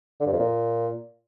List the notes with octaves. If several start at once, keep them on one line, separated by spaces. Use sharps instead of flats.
D3
G2
F2
A#2